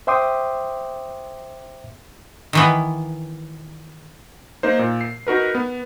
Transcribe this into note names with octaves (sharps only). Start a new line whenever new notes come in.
C5 E5 G5 C6 D6 D#6
D#3 E3 B3
A#3 D#4 C5
A#2
C7
D#4 F#4 A#4 B4
B3